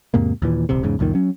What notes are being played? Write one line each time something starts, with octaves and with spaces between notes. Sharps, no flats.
E2 G#2 C3 A#3
D#2 A#2 E3
D#1 C2 C3
E2 G#2 C#3
C#2 F#2 A#2 D#3
F#3 C#4